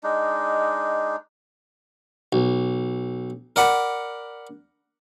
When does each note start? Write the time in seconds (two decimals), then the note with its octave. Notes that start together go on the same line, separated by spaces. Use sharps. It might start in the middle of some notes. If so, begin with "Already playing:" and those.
0.03 G#3 D4 D#4
2.33 B1
3.56 A#4 D5 F#5 B5